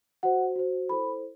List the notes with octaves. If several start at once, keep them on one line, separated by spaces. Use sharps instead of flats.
F#4 C5 F#5
F#4 C5
E4 A4 C5 B5